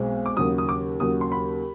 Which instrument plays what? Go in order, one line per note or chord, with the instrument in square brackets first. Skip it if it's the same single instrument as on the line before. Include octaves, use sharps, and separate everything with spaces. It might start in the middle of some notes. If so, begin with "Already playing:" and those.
Already playing: [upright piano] B1 B2 G#3 C4
D6
D#2 C#3 F#3 D#6
D#6
D6
D#2 C#3 F#3 D#6
C6
B5